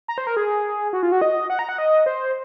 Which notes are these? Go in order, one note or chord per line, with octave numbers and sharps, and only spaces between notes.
A#5
C5
A#4
G#4
F#4
F4
F#4
D#5
F#5
A#5
F#5
D#5
C5